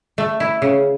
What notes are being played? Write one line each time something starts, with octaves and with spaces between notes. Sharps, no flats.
A3
E4
C#3